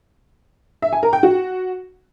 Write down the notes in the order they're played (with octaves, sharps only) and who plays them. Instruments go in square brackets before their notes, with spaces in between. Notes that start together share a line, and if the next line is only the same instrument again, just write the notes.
[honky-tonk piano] E5
G#5
A#4
G5
F#4